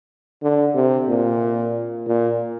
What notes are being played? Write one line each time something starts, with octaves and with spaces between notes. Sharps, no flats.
D3
C3
A#2
A#2